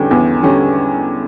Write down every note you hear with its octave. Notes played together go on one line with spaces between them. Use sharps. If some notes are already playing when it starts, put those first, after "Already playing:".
Already playing: E2 D3 G3 C#4 G5
E2
D3 G3 C#4